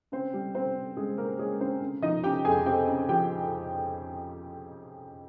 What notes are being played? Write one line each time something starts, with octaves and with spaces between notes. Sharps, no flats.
C#3 C4 C5
G3
C#3 C4 C5
C#3
C#3 G#3 G#4
C#3 A#3 A#4
G#3 C#4 G#4
C#3 C4 C5
C#3
F3 D#4 D#5
C#3 G4 G5
F2 G#4 G#5
C4 G4 G5
C#3
F3 G4 G5